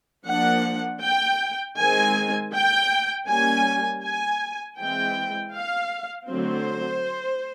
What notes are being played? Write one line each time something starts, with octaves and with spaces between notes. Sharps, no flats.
F3 A#3 D4 F#5
G5
D#3 G#3 C4 G#5
G5
G3 A#3 C#4 G#5
G#5
E3 G#3 C4 G5
F5
D3 F#3 A3 C4 C5